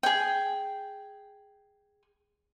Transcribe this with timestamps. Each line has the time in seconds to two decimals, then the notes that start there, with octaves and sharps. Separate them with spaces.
0.03 G#4 G5